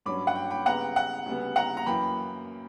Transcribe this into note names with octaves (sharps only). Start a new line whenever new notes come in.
G2 F#3 C#4 B5 D6
F#5
G5
G5 B5
C#3 G3 B3 F#5 A#5
G5
F#5
D2 C#3 G3 B3
F#5 A#5
A#5
F#2 E3 A#3 G5 B5